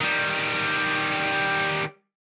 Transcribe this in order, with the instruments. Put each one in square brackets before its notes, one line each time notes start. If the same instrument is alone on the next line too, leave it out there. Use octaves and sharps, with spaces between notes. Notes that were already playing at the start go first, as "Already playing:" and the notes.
[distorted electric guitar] D#3 G3